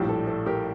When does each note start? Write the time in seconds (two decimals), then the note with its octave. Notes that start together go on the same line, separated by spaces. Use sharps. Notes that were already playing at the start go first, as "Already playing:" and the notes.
Already playing: A#1 A2 G3 G4
0.09 A4
0.27 A4
0.46 G4 A#4